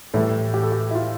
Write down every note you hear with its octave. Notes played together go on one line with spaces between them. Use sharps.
A2 E3 G3 A4
G4
A4
G4
E4
F4